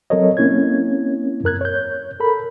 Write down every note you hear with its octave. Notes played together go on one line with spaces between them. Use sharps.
F#3 C4 A4 A#4 C#5 D#5
A#3 C4 C#4 E4 C#5 G#6
F#2 A#4 F#6 G#6
C#5 G6
A4 A#4 B5